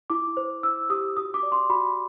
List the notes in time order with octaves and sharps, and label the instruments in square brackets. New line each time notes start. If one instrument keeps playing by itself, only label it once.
[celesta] E4 D6
C5
E4 E6
G4 D#6
F#4 D#6
D6
D5
C6
F#4 B5